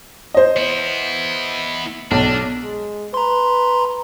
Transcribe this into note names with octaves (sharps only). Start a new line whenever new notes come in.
C5 D#5
B3 E4
B1 D4
G#3
B4 A#5 C6